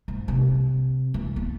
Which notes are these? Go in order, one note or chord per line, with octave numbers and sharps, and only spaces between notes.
G#2
C3
E3
B3